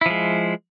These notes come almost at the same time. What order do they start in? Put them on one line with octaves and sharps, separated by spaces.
E4 F3 G#3